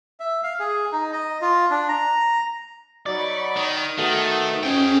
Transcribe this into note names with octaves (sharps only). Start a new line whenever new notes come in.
E5
F5
G#4
D#4
D#5
F4
D4
A#5
F#3 D#4 D5 B5 C#6
D#3 D#6
D#3 A3 B3 F#4
F2 C#4 G#4 G5